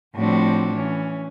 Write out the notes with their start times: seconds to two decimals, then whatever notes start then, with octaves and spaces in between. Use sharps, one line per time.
0.16 A2 F3 G3 C4 D4 F#4
0.73 E3 C#4